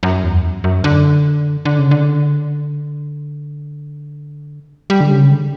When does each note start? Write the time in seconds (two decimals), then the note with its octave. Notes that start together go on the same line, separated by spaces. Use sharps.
0.03 F#2
0.23 E2
0.44 F#2
0.64 F#2
0.84 D3
1.65 D3
1.79 C#3
1.91 D3
4.90 G3
5.01 D3
5.10 C#3
5.31 D3